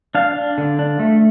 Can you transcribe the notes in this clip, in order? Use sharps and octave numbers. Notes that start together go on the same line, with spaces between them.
D4 F5
D4
D3
D4
A3